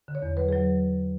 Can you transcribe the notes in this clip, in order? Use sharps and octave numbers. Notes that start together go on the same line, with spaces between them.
D3
C#5
E2
F#3 B4
G#4
F#3